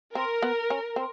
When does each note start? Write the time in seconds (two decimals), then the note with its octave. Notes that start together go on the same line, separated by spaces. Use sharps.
0.15 C4 A#4
0.42 B3
0.70 C#4
0.96 C4